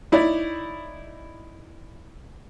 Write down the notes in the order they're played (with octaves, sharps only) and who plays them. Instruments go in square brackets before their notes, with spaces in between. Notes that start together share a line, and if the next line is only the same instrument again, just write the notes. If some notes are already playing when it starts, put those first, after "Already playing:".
[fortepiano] D#4 E4 C#5 D5